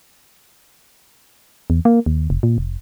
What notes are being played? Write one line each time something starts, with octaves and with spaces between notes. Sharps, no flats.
E2
A#3
D#2
F1
A#2
F1